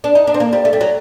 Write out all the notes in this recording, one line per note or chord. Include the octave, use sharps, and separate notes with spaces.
D4
D#4
D4
C4
A#3
G3
A3
G3
F#3